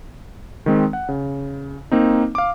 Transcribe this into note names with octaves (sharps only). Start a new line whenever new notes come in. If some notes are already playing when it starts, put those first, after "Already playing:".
D#3 G#3 C4
F#5
C#3
A#3 C4 D#4
F5 D6